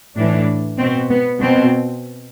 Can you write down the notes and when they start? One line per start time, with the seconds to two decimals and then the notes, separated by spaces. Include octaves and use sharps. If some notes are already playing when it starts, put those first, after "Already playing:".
0.16 A2 E3 D4
0.78 B2 C4
1.09 B3
1.41 B2 C4